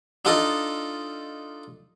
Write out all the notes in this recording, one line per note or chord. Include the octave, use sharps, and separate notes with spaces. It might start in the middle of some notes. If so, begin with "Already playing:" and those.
D4 D#4 F4 A4 D#5